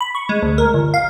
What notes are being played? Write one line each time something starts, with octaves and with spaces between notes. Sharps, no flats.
B5
C#6
G#3
D2
A#4
G1
F5